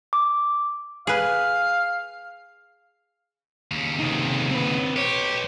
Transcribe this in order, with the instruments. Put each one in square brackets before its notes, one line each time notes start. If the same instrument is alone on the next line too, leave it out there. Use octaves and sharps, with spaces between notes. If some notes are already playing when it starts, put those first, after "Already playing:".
[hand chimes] D6
[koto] G#4 B4 [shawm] F5
[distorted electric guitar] D#2 C#3
[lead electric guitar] C3 D#4
C4 B4
[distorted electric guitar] G4 [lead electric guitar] B4 C#5